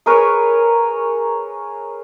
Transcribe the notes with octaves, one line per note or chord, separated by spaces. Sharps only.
G#4 A#4 B4 C#5